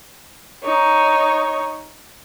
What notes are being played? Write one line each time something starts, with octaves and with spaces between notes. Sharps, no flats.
D#4 C#5